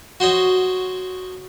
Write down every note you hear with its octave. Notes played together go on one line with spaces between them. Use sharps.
F#4 C5 C#5 D#5